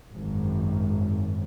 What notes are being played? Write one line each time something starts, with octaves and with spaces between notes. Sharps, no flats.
G#1 F#2